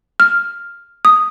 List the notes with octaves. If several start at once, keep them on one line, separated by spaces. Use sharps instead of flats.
F6
D#6